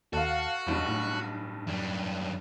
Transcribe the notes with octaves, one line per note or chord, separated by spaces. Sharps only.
D#2 F#4 A4 F5
F#1 B1 E2 G2
A2
F#2 G3